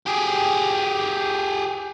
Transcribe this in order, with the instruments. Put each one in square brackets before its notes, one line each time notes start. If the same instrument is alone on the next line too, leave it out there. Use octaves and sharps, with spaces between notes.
[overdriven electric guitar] G4 G#4